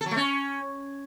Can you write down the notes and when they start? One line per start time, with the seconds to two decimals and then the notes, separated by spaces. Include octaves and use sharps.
0.01 A4
0.06 F#3
0.11 A3
0.16 C#4